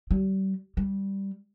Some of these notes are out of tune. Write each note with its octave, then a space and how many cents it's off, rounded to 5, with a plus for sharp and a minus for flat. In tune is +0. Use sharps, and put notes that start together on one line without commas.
G3 -35
G3 +0